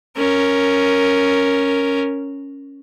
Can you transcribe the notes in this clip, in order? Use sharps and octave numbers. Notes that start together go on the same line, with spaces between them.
C#4 A#4